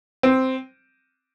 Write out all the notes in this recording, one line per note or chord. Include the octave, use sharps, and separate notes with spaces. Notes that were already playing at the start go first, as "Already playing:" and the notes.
C4